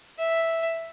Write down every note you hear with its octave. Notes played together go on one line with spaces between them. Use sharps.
E5